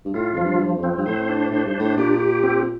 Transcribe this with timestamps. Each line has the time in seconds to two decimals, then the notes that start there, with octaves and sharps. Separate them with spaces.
0.05 G2
0.14 A2 F4
0.33 F2 F3
0.44 G2
0.59 F3
0.75 F2
0.83 C4
0.97 G2
1.06 A2 C5
1.29 D4
1.51 A2 C5
1.65 G2
1.74 D4
1.79 A2
1.97 A#2 G4
2.20 G4
2.43 C4